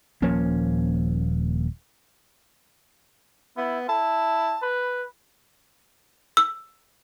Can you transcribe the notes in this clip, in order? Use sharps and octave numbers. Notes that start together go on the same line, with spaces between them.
D#1 F3 A#3 C#4
B3 E4
E4 A5
B4
E6